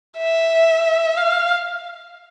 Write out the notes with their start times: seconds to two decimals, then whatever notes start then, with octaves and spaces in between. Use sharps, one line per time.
0.19 E5
1.17 F5